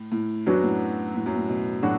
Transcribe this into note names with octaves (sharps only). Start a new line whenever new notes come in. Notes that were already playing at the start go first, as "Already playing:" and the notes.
Already playing: A2
A2
F#2 F#3 B3 D4 F#4
A2
A2
F#2
A2
B2
A2 F#3 D4 F#4